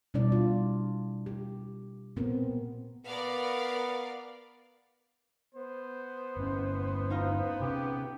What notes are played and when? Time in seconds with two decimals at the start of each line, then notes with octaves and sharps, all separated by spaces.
0.14 B2 G3 D4 E4 D5
0.32 F4
1.26 G4
2.17 A#2 B3 C4 A#4
3.06 B3 A#4 D5 F5
5.54 B3 C5
6.37 G1 C#4
7.10 D#4 F4 A#5
7.60 C3 C#4 G4